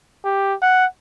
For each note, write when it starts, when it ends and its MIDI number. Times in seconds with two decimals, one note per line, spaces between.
0.24 0.54 67
0.62 0.85 78